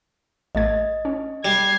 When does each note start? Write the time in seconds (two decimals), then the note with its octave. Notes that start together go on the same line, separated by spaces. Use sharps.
0.55 A1 A3 D#5 G#6
1.05 C#4
1.45 G3 G#6 C7